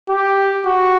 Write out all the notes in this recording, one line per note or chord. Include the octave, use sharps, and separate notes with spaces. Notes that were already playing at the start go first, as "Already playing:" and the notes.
G4
F#4